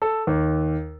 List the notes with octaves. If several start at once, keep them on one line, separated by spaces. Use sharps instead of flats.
A4
D#2